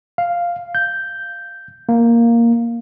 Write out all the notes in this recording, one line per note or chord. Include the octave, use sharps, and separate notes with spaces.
F5
G6
A#3